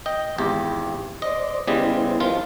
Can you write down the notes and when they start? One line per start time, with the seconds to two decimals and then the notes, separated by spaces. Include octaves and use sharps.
0.06 D#5 G5
0.38 G#1 E2 G4
1.22 C5 D5 D#5
1.68 C#3 G3 B3 E4 C5 D#5
2.20 D#3 F3 F4